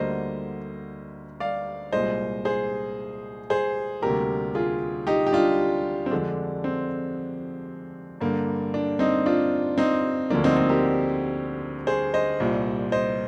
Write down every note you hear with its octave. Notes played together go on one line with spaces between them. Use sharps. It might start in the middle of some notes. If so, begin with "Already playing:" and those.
Already playing: D2 D3 G3 A#3 C5 D#5
D5 F5
C2 A#2 G#3 C5 D#5
G#4 C5
G#4 C5
D2 C3 G3 A#3 G4 A#4
F4 G#4
D#4 G4
G4
D4 F4
C4
F2 D3 G#3 D4
C4
G2 D3 G3 A#3
D4
C4 D#4
D4 F4
C4 D#4
D2 D3 F3 A#3 D4
C4 D#4
C4 D#4
G4 A#4
G#4 C5
C5 D#5
C2 A#2 G3
C5 D#5